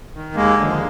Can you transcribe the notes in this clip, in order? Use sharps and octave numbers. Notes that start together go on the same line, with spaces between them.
D#3
D#2 G#3 A#3
D3 F3